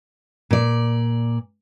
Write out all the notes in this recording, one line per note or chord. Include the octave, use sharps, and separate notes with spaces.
A#2 D5